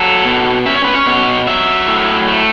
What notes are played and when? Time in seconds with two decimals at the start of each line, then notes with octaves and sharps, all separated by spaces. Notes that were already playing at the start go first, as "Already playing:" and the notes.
Already playing: F#3 A4
0.25 B2
0.66 C#4 E5
0.75 C#5
0.84 B4
0.94 C#5
1.06 B2
1.47 F#3 E5
1.87 A2
2.28 A3